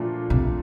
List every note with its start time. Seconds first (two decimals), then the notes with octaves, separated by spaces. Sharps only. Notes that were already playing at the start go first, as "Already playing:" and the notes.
Already playing: A#2 F3 A3 D4 F4
0.30 C3